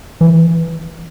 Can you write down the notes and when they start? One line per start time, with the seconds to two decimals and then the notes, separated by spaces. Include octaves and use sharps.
0.21 E3